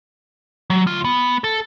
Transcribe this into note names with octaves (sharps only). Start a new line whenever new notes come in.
F#3
D2 F4
B3
A4